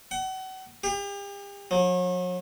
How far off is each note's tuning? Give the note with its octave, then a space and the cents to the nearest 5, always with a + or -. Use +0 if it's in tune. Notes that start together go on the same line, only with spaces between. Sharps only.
F#5 +35
G4 +40
F#3 -40